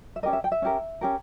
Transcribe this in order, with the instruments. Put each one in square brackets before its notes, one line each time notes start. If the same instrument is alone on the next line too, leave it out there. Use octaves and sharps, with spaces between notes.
[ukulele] E5
C#4 G4 A#4 D#5
E5
G5
E5
C#4 G4 A#4
C#4 G4 A#4